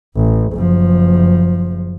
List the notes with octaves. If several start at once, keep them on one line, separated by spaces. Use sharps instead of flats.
A1
F#1 F3